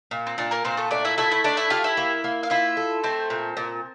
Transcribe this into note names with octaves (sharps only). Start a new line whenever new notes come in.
A#2
C4
A#2 D4
A#3 A#4
A#2 C4 C5
A3 A4
A3 D4 D5
E4 E5
A3 E4 E5
E4 E5
A3 D4 D5
E4 E5
F4 G4 F5
E4 E5
A#3
A#3
F5
E4 F4 E5
A4
A3 C4 C5
A#2
A#2